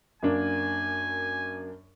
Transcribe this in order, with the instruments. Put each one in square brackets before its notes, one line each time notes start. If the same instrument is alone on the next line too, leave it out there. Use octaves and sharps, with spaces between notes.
[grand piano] F#2 A#3 D4 [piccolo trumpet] G#5